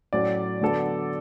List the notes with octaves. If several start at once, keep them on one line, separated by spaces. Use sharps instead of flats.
A2 F#3 C#4 D5
D3 F#3 B3 A4